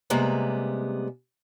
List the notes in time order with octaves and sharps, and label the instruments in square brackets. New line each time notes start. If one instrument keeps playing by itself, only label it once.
[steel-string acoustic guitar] C3 G3 G#3 A#3 B3